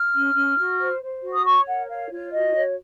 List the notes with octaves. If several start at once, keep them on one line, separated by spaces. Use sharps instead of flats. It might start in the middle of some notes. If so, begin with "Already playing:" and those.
Already playing: F6
C#4
C#4
F#4
C5
C5
F#4
D#6
C#5 C#6
A#4 F#5
C#5 F5
F4 C#5
F#4 D#5
C#5